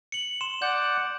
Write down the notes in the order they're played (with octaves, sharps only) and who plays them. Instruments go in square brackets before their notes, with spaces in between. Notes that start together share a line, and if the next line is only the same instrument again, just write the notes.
[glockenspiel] C#7 F#7
C6 E7
[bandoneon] D5 F#5 [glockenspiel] G6